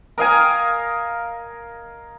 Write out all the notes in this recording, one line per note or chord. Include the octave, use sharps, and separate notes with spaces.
A#4 D#5 F5 G#5